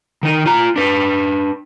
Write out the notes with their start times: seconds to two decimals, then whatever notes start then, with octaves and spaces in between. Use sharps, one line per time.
0.23 D#3 D#4
0.46 F4 A#5
0.76 D4 B4